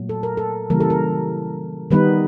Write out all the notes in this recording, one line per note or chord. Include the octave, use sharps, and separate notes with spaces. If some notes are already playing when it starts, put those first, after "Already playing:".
Already playing: A#2 F#3 A3
A4
A#4
A4
C#3 E3 G3 A#3 A#4
A4
A#4
D#3 G3 B3 D#4 B4